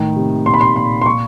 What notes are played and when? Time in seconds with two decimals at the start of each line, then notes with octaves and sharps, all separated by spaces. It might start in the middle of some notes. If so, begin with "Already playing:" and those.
Already playing: A2 D#3
0.16 C3
0.46 A#2 C6
0.54 B5
0.61 C6
0.76 A#2 C6
1.02 C6
1.06 A#2 C#6